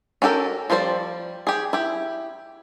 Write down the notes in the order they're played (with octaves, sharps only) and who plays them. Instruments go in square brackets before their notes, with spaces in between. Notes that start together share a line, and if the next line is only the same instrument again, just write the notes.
[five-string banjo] C#4 F#4 G4 A4 A#4
F3 G3 G4 C5 D5
G4 G#4
E4 G4